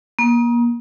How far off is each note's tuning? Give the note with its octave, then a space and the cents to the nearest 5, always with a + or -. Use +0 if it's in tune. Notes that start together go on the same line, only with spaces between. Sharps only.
A#3 +35